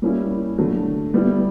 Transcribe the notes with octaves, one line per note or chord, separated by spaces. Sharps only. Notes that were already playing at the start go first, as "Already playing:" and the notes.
G3 A#3 C#4 E4
D3 F#3 A3
G3 B3 E4